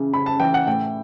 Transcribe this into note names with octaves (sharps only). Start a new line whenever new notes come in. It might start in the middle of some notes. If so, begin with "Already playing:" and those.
Already playing: C#3 E3
C#3 B5
A5
E3 G5
F#5
A2 G5